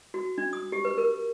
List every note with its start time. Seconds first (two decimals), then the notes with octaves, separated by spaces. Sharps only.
0.14 F#4
0.38 D4
0.53 D#6
0.72 G4
0.85 B4
0.98 A#4